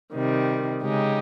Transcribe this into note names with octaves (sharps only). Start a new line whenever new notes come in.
C3 D#3 G3
C#3 G#3 D#4 G4